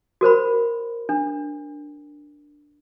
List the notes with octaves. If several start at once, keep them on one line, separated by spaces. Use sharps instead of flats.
F#4 A#4 C5 B5
D4